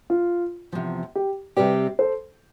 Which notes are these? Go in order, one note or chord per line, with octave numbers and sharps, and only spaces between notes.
F4
E2 C3 F3
G4
C3 G3 C4 G4 B4 D5
A4 C5